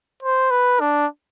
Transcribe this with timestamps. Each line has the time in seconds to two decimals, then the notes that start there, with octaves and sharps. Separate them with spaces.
0.22 C5
0.51 B4
0.80 D4